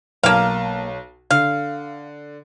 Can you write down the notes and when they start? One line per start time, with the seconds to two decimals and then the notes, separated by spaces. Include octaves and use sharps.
0.23 B1 A#3 F5 A5
1.31 D3 F5